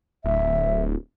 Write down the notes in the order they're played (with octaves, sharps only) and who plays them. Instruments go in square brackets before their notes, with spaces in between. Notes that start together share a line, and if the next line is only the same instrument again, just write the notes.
[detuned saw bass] D1 [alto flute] E5